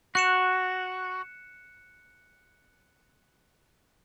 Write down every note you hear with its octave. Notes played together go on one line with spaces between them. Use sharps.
F#4 F#6 C#7 E7